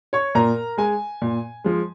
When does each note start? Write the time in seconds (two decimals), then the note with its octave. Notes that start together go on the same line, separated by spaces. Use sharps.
0.13 C#5 C#6
0.35 A#2 A#4 A#5
0.78 G#3 G#5
1.22 A#2
1.64 F3 G#3